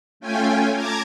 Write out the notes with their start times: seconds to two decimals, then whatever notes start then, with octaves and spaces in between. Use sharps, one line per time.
0.20 A3 C#4 F4 G5 G#5
0.72 A5 A#5 D6 G#6